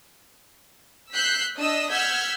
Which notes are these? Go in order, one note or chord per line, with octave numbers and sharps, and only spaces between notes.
E6 F#6 G6 B6 C7
D4 D#5 D#6 E6
F#5 E6 F6 G6 G#6 B6